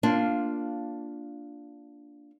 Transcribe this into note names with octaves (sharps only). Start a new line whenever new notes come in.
A#3 D4 F4